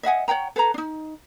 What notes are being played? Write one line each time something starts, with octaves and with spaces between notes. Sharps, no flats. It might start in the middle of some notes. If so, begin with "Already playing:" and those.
D#5 E5 F#5 G#5
C#5 F#5 G5 A#5
A4 B4 C#5 A#5
D4 D#4